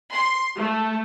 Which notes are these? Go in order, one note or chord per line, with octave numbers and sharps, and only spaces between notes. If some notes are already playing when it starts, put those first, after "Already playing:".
C6
A3